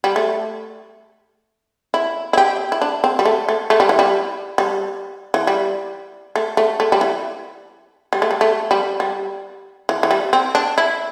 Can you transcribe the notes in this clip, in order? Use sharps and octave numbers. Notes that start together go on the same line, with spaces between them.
G3
A3
E4
E4
G4
E4
D4
C4
G3
A3
A3
A3
G3
E3
G3
G3
E3
G3
A3
A3
A3
G3
E3
G3
A3
G3
A3
G3
G3
E3
E3
G3
C4
D4
E4